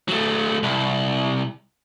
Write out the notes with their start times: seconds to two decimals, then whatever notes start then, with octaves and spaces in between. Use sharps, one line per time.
0.09 F#3 A3
0.63 C2